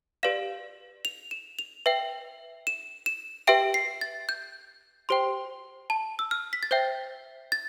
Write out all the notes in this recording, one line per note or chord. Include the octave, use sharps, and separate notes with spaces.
G4 B4 D5 F5 E7
F7
E7
F7
B4 E5 G5
E7
E7
G4 B4 E5 G5 D7
C7
A6
G6
G4 C5 G5 C6
A5
E6
F6
B6
A6
C5 E5 G5 G6
A6